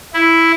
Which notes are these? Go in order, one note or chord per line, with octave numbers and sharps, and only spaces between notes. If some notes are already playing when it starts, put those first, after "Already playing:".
E4